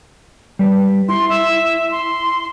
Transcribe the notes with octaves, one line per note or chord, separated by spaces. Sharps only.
G3 B4
E4 C6
E5
C6